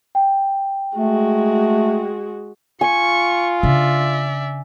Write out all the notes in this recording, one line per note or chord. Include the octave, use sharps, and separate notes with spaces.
G5
G#3 A3 F#4
F4 G#5 C#6
C#3 D4 D5 E5